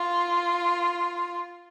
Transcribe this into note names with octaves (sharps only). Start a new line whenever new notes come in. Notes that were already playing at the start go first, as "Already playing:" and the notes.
Already playing: F4